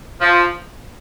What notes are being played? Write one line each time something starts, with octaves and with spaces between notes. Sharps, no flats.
F3